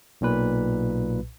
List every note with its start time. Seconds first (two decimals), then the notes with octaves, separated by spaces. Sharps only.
0.21 B1 A#2 B4